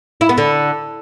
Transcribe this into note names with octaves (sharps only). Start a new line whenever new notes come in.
E4
B3
D3